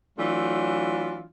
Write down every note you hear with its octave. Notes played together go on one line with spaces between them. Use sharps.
E3 F#3 A3 D4 F4